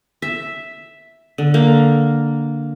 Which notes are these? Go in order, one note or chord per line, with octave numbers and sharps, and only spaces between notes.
E5
D3
A#3